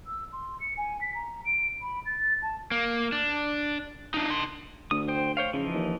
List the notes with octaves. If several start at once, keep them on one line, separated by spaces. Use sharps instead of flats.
E6
C6
C#7
G#5
B6
A#5
D7
B5
A6
A5
A#3
D4
D4 D#4
D4 C6
D2 D#6
C5 G5
C5 C#5 F5
C#3 E3 F3 D#4
D#2